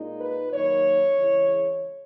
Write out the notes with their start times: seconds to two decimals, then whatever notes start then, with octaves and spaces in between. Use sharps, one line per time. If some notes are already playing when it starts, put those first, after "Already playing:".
Already playing: A#2 G#3 D#4
0.21 B4
0.53 F#2 D#3 A#3 D#4 C#5
1.16 C#3 E3 G#3